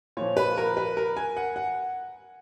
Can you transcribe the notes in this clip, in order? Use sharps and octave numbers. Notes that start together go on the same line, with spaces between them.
A#2 F3 C#5
B4
A#4
B4
A#4
G#5
F#5
F#5